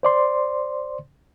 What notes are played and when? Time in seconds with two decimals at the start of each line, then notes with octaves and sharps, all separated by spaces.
0.03 C5 D5 C6